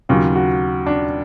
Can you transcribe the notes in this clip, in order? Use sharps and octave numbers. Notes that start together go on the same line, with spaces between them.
D#2 C#3 F#3 F4
F#4
D4